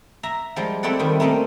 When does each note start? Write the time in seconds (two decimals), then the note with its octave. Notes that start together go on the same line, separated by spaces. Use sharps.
0.23 E5 A#5
0.56 F3 G3 G#3
0.83 A3 C4 E4 A4 D5 F#5
0.99 D#3 G3
1.20 A3 A#3 C4 C#4 D#4